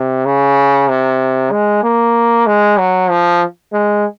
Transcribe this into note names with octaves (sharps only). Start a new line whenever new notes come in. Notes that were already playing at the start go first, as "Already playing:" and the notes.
Already playing: C3
C#3
C3
G#3
A#3
G#3
F#3
F3
G#3